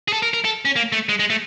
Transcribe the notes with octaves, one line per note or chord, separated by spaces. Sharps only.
G#4
A4
A#4
A#4
A4
C#4
A#3
A3
G#3
G#3
A3